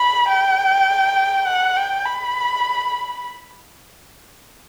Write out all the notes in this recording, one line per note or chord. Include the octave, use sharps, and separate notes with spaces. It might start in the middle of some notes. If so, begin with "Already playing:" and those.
Already playing: B5
G5
F#5
G5
B5